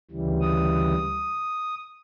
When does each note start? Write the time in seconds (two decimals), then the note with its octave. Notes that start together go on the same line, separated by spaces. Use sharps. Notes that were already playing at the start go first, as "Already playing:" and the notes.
0.11 D2 C#3 E3 G3
0.41 D#6